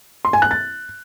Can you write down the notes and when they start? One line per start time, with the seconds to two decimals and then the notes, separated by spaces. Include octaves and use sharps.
0.25 C6
0.33 G#5
0.42 F#6
0.51 A6